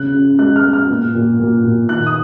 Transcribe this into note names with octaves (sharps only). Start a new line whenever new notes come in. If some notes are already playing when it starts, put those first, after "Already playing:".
Already playing: C#3 F#6
C#3
G#3 F#6
F6
G#3
F6
A#2
A#2
A#2
A#2
D#3 F#6
D#6